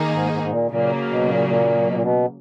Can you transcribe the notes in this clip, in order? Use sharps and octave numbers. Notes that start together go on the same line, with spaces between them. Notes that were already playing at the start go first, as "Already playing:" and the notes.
Already playing: D#3 A#3 D#4 G#4
G#2
G#2
G#2
A#2
A#2 C#3 F#3 A#3
B2
A#2
A#2
B2
A#2
B2